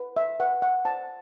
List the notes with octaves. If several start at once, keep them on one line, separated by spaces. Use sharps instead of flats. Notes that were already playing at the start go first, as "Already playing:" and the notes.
Already playing: B4
E5
B4 F#5
F#5
C5 A5